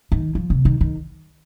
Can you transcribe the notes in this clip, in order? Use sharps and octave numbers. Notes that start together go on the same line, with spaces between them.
D#3
F3
C3
D#3
D#3